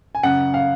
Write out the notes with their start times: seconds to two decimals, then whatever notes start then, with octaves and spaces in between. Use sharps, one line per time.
0.15 G#5
0.23 F#2 C#3 F#5
0.54 F5